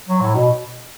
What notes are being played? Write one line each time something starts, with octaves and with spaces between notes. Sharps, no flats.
F#3
A2
B2